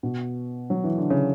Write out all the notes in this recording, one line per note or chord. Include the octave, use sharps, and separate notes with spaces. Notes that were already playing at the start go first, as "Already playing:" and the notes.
B2
F#3
E3
D3
C#3